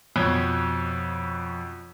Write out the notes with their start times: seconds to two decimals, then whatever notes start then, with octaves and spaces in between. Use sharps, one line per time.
0.16 F2 B2 C#5 G#6